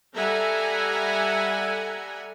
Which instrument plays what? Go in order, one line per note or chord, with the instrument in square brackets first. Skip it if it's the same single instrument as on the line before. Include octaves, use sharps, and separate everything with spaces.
[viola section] G3 A4 E5 F#5 G#5 A#5